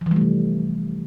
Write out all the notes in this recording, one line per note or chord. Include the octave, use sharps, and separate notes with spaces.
C3 E3 F3 G3 A3